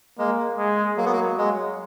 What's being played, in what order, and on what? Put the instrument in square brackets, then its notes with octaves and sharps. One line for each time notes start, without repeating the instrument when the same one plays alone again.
[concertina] G#3 [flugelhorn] A#3
[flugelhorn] G#3
[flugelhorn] F#3 [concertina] A#3
[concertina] B3
A#3
G#3